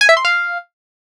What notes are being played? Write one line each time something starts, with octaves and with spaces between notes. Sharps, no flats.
G#5
E5
C6
F5